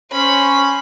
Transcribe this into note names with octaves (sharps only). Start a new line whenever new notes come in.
C#4 C5 B5